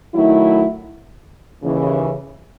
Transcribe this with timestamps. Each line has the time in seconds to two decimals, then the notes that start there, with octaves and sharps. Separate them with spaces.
0.15 D#3 F#3 A3 E4
1.62 D#2 C#3 E3